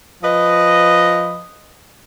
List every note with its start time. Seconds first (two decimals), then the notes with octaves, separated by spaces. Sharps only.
0.23 F3 B4 D#5